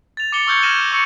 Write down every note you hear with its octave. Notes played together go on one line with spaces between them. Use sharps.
A6 F7
D6 C#7 G7
C#6 E6 F6 G6 G#6 C#7
F6 A#6 D#7 E7 F#7 G7
C#6 D6 E6 C#7